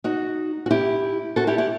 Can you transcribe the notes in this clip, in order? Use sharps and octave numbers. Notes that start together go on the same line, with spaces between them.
D#4 F#4
F#4
E4 G4
F#4 A4
E4 G4
E4 G4